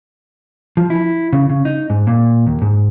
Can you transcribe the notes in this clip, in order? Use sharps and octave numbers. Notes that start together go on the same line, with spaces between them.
F3
E4
C#3
C#3
D#4
G#2
A#2
D#2
G#2